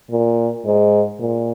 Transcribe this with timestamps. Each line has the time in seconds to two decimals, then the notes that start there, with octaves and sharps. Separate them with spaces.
0.11 A#2
0.65 G#2
1.19 A#2